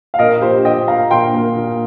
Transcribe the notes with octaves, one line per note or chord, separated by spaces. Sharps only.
F5
A#2 A#4 D#5
F3 G4 C5
F3 D#5 G5
A#3 F5 A#5
A#2 G5 C6
A#3
A#2